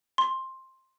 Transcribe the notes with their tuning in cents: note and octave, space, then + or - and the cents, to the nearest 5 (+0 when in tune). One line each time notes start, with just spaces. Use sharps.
C6 +10